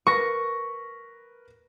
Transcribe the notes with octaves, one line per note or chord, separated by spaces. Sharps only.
A#4 B4 C#6 A#6